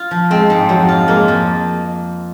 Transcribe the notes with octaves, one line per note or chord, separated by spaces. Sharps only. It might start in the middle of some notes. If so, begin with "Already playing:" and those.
Already playing: F4
F3
G#3 C4
G#2
F2 F#3
F4
G#3 A#3
F2